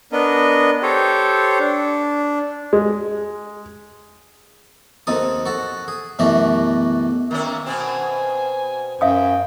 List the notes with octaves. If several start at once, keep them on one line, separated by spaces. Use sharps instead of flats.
B3 D4 A#4 D#5
G4 A4 C5 C#5
D4
G#3
D#2 D#3 C4 A4 D#6
F#4 A4
G#4
F#2 B2 E3 A3 F#4 G4
D#3 A#3 C#4 E5
B2 C4 G#5
F#2 E5 F5 G5 D#6